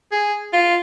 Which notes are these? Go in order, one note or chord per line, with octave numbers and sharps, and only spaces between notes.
G#4
F4